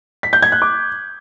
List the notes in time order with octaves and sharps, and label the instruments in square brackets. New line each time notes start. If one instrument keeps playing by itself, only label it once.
[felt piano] B6
G6
G#6
F#6
D6